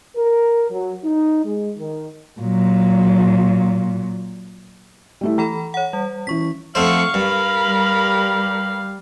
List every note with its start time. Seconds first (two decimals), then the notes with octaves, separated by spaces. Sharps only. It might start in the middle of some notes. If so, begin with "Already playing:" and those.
0.16 A#4
0.70 F#3
1.05 D#4
1.44 G#3
1.78 D#3
2.41 A#2 F#3
5.21 G3 A3 E4
5.38 E3 A4 A#5 B5
5.74 C#5 F#5
5.93 G3
6.27 E3 C#4 C#6 B6
6.75 F2 A3 C5 F5 F#5 C#6
7.14 G2 A#4 B5
7.63 G3